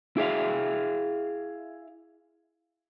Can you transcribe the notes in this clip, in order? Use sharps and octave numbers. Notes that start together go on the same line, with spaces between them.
E4 G#4 E5 F5